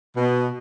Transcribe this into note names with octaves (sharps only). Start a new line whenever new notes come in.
B2